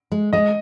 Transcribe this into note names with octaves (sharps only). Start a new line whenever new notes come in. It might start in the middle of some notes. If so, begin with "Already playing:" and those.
G#3
G#3 D#5